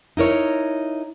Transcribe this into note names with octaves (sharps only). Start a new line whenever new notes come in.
D#4 E4 A#4 C#5